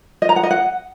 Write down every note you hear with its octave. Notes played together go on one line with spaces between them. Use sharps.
D#5
A#5
F#5
D#5
F#5